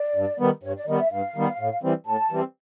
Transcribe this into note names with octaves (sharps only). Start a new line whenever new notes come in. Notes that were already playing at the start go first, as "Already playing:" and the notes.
Already playing: D5
G2
D#3 G3 B3
G2 C#5
D5
D#3 G3 B3 D#5
E5
G2 F5
D#3 G3 B3
A2
E3 G3 C4
A2 A5
E3 G3 C4